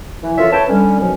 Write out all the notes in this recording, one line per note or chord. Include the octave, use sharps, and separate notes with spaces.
E3
C#4 F4 A4 A#4 C#5 E5
A4 B4 C#5 E5 G5 A5
D3 G3 C#4
B2 D#3 F3 F#3 C#4